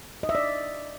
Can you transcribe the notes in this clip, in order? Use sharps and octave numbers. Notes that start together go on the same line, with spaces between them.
D#5
E5
D5